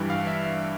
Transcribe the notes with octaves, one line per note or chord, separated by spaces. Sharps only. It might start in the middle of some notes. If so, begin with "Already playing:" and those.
Already playing: G2 E3 G3
F5
E5